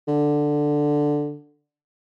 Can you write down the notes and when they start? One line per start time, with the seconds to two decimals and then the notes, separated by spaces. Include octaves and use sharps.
0.08 D3